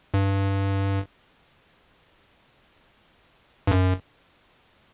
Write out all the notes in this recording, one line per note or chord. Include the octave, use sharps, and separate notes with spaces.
G2
G2
F#2